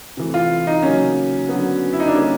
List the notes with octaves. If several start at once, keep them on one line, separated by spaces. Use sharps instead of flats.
C3 E3 A3
F4
D#4
C#3 F#3 A#3 C#4
D3 F#3 B3
E4
D#4
D4
D3 G3 A#3 C#4